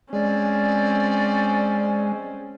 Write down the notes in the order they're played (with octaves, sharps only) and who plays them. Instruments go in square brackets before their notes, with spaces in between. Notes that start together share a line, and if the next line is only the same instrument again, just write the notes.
[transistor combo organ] G#3 [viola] C4 C#4 [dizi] D5